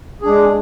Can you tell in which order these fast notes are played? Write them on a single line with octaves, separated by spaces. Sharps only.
G#4 D4 G#3